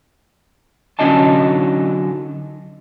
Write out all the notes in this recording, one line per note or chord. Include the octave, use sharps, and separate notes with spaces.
D3 F#3 C#4 D#4 D#5 A5